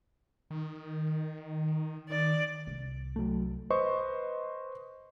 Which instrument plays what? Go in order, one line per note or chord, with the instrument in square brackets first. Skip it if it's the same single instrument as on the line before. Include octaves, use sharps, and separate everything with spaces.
[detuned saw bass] D#3
[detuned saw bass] D#3 [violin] D5
[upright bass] C2
[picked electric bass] F#3 A3
[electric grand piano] B4 C5 D#5 C6 C#6